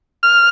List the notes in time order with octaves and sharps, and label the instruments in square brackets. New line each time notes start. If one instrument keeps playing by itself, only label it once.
[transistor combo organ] F6